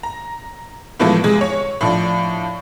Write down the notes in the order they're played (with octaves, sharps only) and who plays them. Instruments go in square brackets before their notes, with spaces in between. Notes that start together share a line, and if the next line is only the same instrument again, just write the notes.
[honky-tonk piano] A#5
A2 E3 F3 G#3 A3 B3
C3 G#3 G#4
C#5
A2 F3 D4